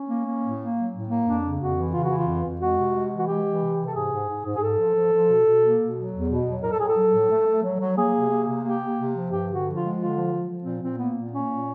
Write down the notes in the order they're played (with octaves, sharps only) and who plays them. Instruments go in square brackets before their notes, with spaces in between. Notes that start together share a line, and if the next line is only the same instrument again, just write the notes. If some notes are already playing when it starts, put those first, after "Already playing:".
Already playing: [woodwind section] C#4
A#3
A#3
A2
A#3
F#3
A2
A#3
F2 D4
C#3
F2 F#4
E3
C#3 F4
F#4
E3
F4
F2
F2
G#3 F#4
C3
G#3
E3
F#4
G#3 G4
E3
C3
C3
A4
G#2 G#4
G#2
G#2
G#2
G#4
G#2 A4
F3
F3
F3
B2
B2
A#3
B2
F#3
E2
B2
F#3
A2 A#4
A4
A2 G#4
A4
F#3
A2
A3
A3
F#3
F#3
A#3 G#4
C3
A#3
C3
A#3 G4
A#3
C3
F3
G2 G4
D3
F#4
F3
F4
G#3
D3 F4
F3
F3
F3
A#2 C4
A#2 C4
A#3 B3
A#2
A#3 C#4
A#2